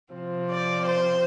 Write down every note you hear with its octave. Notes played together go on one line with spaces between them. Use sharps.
C3 F3 C4
D5
C5